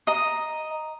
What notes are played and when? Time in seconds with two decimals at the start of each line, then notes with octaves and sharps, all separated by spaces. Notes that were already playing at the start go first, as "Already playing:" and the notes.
0.07 D#5 A#5